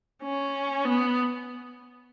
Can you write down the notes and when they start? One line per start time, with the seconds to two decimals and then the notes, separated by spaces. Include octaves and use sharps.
0.23 C#4
0.84 B3